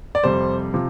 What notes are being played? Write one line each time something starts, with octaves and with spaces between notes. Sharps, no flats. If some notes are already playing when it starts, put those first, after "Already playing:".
D5
F2 C3 G3 C5
C3 F3